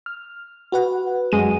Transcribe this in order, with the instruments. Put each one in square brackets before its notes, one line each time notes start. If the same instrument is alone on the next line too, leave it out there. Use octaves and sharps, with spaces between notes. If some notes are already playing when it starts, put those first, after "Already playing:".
[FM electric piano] F6
F#4 B4 F#5
[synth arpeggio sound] F#2 G#3 D#7